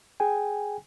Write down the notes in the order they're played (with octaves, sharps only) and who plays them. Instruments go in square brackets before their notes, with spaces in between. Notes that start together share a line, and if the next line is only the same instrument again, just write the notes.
[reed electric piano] G#4 G5 G#5